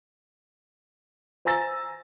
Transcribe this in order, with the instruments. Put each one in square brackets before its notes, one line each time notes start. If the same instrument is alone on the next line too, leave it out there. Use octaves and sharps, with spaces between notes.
[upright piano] C5 G#5 A#5 E6 A6 A#6